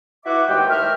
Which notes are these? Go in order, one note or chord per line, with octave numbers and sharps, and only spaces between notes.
E4 F#4 B4 E5 F#5 D6
D#2 D#3 G#3 G4 G5
A3 G4 A#4 E5 F6